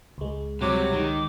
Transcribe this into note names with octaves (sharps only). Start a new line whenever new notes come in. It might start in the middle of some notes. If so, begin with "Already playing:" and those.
C#2 G#3
C3 F#3 G3 D6
D#3